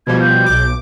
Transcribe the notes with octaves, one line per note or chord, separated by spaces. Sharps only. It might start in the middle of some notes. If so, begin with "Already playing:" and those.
B2 F3 G3 G#6
G6
B1 D6